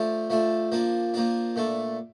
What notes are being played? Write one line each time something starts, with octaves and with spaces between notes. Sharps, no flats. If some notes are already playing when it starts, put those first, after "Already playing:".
Already playing: F3 A3 D4
F3 A3 D4
F3 A#3 D4
F3 A#3 D4
A#2 A3 D4